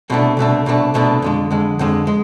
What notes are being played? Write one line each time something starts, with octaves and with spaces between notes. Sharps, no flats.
C2 B2 A3 D4
C2 B2 A3 D4
C2 B2 A3 D4
C2 B2 A3 D4
F2 D3 G#3
F2 D3 G#3
F2 D3 G#3
G#3